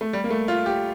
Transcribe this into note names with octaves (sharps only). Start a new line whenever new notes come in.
A3
G3
A#3
A3
F4
G4